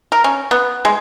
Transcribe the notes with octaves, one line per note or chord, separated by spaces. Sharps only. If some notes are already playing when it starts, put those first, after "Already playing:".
A#4
C#4
B3
G#3